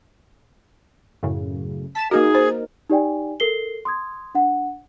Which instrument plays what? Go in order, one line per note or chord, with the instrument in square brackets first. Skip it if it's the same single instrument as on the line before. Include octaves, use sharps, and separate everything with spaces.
[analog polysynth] F#2 A2 C#3
[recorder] A5 [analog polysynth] B6 E7
[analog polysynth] A#3 D#4 A#4 [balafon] F#4 [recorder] G#4
[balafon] C5
[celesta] D#4 G4 D5 G5 G#5
A4 A#4 C7 G7
C6 D#6 G#6
D4 F#5